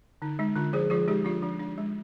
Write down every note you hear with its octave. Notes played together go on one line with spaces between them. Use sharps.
D3 D#4
G#3 D#4
D3 D4 F4
F3 G#4 C5
F3 F4 G#4
G#3 D#4 G4
F3 D4 F4
F3 D4
D4
G#3